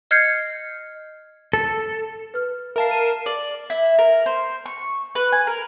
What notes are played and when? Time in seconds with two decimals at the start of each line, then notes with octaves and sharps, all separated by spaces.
0.11 D#5 F6 G6 G#6 C7 C#7
1.53 A4
2.34 B4 F6
2.76 A#4 E5 F5 A5 C7
2.91 D#7
3.26 D5
3.70 E4
3.99 A#4
4.26 C5
4.66 C#6
5.15 B4
5.32 G#5
5.47 A#4